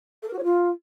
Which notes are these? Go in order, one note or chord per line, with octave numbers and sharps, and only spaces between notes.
A4
A#4
F#4
C#5
F4